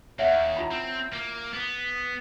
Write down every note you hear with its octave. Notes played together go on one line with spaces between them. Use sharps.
D#2 C#5 E5 F#5
E4 F4 B5
C4
A#3
B3